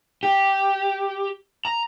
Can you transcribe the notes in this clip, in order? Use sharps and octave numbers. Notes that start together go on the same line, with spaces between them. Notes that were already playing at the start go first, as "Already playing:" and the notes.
G4
A#5